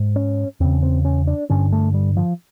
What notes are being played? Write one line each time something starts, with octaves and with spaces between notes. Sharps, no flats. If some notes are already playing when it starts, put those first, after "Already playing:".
Already playing: G#2
C#4
E2 C#3 C4
C4
C#4
D4
G2 D3 C#4
A3
G3
F3